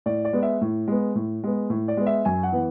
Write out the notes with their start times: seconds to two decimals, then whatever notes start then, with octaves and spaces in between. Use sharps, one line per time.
0.06 A2 D5
0.25 D5
0.33 G#3 B3
0.43 E5
0.61 A2
0.88 G#3 B3
1.15 A2
1.44 G#3 B3
1.70 A2
1.88 D5
1.97 G#3 B3
2.07 E5
2.25 F#2 G#5
2.43 F#5
2.52 E3 B3